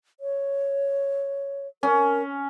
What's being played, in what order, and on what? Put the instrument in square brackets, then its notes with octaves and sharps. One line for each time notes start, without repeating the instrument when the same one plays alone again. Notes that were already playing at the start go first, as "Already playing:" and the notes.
[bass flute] C#5
[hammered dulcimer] C#4 [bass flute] A#4